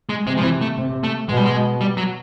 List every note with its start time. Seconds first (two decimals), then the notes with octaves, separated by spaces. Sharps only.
0.09 G#3
0.27 C3 G#3
0.38 F3
0.43 E3
0.61 A3
0.78 C3
1.04 A3
1.29 B2 G#3
1.37 G3
1.46 G#3
1.81 G3
1.97 F#3